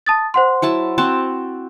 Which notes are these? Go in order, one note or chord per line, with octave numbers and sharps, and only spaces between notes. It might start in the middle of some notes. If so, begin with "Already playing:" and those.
A5 D#6 A6
C5 F#5 C6
F#3 E4 A5
C4 F#4 A5